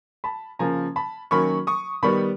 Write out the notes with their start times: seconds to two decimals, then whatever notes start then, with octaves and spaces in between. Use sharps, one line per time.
0.24 A5 B5
0.59 C#3 F3 A#3 C#4 G#5 A#5
0.96 A5 B5
1.31 D#3 F#3 A#3 C#4 B5 C#6
1.67 C#6 D#6
2.03 D#3 G3 B3 B5 C#6